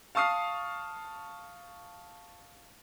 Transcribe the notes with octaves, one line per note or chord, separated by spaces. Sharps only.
F5 A5 C#6 D#6 F6 C7